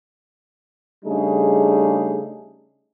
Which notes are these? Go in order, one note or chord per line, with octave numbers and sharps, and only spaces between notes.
C#3 G3 A3 D4 D#4 G#4